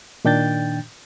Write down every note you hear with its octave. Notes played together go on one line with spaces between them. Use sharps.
A#2 D#3 D4 G5 G6 A6